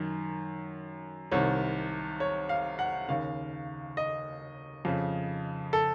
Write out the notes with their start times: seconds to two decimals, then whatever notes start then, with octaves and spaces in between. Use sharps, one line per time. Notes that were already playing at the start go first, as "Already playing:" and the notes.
Already playing: F#2 D#3
1.31 C2 C3 D#3 C#5
2.20 C#5
2.49 F5
2.79 F#5
3.08 D#2 C#3 F5
3.97 D#5
4.85 F2 C#3
5.73 A4